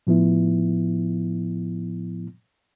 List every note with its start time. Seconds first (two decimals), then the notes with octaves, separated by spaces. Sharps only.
0.07 A2 F3 B3 E4